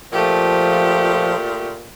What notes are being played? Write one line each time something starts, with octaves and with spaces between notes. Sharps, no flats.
A#2 F3 A3 G4